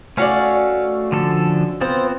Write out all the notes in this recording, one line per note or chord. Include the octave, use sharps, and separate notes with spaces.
A3 C#4 F#4 D5 F5
D3 F3 A4
B3 C4 F4 C5